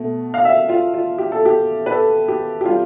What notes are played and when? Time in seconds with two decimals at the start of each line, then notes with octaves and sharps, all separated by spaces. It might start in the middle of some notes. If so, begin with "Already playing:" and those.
Already playing: B2 A3
0.34 F5
0.45 E5
0.69 F4
0.94 F4
1.18 G4
1.32 A4
1.45 G4
1.86 B4
1.92 A4
2.28 G4
2.61 G4
2.65 C3 G3 F4